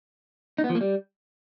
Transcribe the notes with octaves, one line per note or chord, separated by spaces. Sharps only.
D#4
B3
F3
A#3
G3